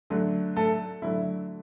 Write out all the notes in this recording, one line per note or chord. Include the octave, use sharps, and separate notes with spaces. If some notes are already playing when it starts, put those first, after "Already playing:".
D3 F#3 A3
A3 A4
D3 F#3 A3 E4